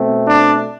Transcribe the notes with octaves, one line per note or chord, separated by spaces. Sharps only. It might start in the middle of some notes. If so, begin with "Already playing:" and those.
Already playing: B2 A3 C4
D4